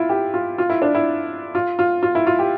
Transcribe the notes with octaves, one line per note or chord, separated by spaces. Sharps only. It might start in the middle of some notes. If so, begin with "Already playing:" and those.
Already playing: E4 F4
G4
F4
F4
E4
D4
E4
F4
F4
F4
E4
F4
G4